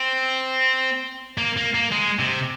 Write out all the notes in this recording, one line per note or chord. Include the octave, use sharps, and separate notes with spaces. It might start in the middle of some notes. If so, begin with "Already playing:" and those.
Already playing: C4
A#3
A#3
A#3
G#3
C3